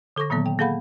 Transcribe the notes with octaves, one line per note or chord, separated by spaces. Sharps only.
D3 A4 C#6 D6 A#6
A#2 D#3 F#3 A#3 B3
G5
A#3 G#4 A4 F5 F#5 B5